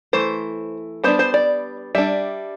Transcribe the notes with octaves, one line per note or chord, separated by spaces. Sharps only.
E3 A3 C5
G3 B3 D4 C5
C5
D5
G3 D4 E5